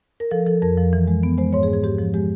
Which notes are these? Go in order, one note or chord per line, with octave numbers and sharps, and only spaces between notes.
A#4
F3 A4
F3 A4
F2 A#4
F3
E3
G#3
B3
G#3 C5
G#2 C#5
G#4
G#2
G#4
G#2 G4
F3
G#3 G4